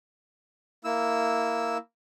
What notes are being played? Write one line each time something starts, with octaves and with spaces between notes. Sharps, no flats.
A#3 E4 E6